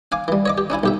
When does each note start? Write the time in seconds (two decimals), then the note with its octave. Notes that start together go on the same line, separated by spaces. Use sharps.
0.12 F5 G#5 D6
0.28 E3 G3
0.46 C#5 D#5 D6
0.58 G4
0.70 C#4 D4 E4 G#5
0.84 B1 G4 E5